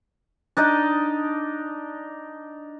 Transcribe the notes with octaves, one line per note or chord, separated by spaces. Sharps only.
D4 D#4 D5 D#5